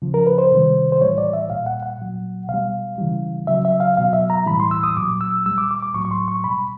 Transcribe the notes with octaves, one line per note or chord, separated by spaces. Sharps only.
C#3 F3
A#4
B4
C5
C3 D#3 G3
C5
A2 E3 G3 C#5
D5
E5
A#2 G3 F5
F#5
F#5
A#2 F#3
B2 F5
G3
C#3 E3 G3
C#3 F#3 E5
E5
F5
B2 F#3 F5
E5
A#5
A2 E3 G3 B5
C6
E6
D#6
A#2 F#3 D6
E6
A#2 G3 E6
D6
D6
D6
A2 F#3 C#6
C#6
C6
C#6
B2 G3 B5